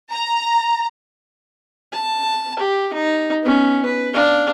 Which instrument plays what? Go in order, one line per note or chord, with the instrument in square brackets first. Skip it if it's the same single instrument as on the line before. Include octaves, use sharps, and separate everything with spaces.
[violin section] A#5
[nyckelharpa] A5
G4
D#4
B3 C#4
B4
D4 F5